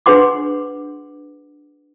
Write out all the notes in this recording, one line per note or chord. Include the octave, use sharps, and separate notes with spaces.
D4 G#4 B4 F#5 C6 D6